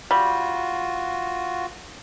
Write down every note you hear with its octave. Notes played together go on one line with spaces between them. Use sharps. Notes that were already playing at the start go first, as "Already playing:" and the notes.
G3 F4 F#4